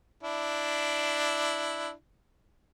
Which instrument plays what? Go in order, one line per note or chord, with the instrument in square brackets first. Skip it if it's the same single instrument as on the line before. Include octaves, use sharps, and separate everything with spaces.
[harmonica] D4 E4